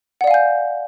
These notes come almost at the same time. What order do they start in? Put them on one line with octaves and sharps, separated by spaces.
F#5 D5 F5 G#5 G6